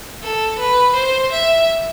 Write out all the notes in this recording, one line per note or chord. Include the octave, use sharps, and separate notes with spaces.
A4
B4
C5
E5